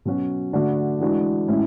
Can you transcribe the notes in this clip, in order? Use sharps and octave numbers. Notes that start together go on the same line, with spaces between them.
B2 F#3 C#4 F#4
D3 A3 D4 F#4
E3 G#3 D4 F#4
A2 G#3 C#4 E4